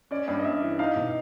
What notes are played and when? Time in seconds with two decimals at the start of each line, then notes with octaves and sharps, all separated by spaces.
0.11 C#4 D5
0.28 G2
0.39 D#5
0.44 G2 E5
0.62 E3
0.79 D#4 F5
0.96 B2